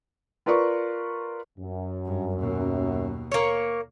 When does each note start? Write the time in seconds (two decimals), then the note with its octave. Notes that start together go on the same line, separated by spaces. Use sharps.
0.46 F4 A#4 B4 D5 C#6
1.58 F#2
2.05 G2
2.37 D#2 B2
3.32 A#3 C#5